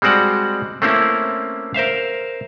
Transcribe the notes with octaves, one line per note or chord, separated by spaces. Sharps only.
G3 G#3 C4 F#4 D5 F#5
A3 A#3 C4 C#4 E4
A#4 C5 E5 F5